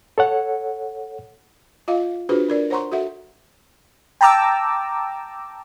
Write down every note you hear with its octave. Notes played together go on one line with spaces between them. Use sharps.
A4 C#5 F#5
F4 D#5 F5
D4 F4 F#4 G#4 B4 C5
D4 A#4 D5
C5 C#5 F#5 A#5 C6 C#6
F#4 A4 E5 F#5
G5 A5 A#5 D6 E6